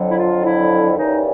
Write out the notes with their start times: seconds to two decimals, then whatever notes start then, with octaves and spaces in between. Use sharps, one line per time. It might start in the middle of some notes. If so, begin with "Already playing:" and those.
Already playing: F2 D3 F#3
0.10 E4
0.17 F4
0.44 E4
0.96 D#2 C#3 E3 G3 D#4